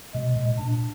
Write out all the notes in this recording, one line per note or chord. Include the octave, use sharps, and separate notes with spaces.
B2 G#3
A#2
A#2 D4